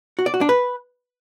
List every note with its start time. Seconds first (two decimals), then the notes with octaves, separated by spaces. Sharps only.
0.19 F#4
0.26 D5
0.34 F#4
0.41 D4
0.49 B4